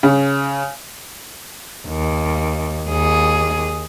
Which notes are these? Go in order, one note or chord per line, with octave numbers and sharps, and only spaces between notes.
C#3
D#2
D#2 G#4